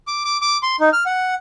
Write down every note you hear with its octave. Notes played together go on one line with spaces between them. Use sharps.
D6
D6
D6
C6
D#4
F6
F#5